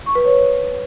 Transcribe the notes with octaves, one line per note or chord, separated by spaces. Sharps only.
C#6
B4
C#5